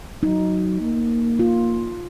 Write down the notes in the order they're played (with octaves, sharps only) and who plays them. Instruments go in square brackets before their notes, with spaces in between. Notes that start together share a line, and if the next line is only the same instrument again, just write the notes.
[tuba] F#3 [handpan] D#4
[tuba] A#3
[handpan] F4